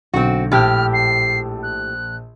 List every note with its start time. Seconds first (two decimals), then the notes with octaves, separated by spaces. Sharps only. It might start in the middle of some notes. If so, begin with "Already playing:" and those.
0.14 B1 D3 C4 F#4
0.52 A#1 A2 G4 A5 F6 G6
0.93 C7
1.63 F#6